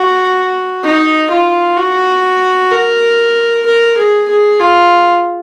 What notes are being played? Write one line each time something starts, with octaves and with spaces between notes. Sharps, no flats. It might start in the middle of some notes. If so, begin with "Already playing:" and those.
Already playing: F#4
D#4
F4
F#4
A#4
A#4
G#4
G#4
F4